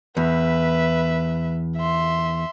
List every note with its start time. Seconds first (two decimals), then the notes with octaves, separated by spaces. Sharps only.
0.17 E2 B4 E5
1.76 E5 C6